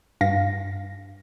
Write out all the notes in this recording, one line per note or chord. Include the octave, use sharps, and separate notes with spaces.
G2 F5 A#6